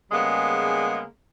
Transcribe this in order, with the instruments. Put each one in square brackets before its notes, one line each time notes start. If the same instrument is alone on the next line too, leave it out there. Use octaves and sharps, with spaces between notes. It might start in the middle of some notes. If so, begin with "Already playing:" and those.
[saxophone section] C#3 G3 G#3 A#3 B3